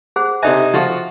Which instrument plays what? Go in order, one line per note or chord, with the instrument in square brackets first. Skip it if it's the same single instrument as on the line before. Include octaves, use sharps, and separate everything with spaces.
[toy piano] G#4 C5 F#5
[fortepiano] C3 D#4 G#5 [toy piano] C5 E5
[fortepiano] F3 F4 F#4